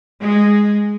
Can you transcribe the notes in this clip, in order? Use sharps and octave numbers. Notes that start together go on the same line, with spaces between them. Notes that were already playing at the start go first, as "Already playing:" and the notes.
G#3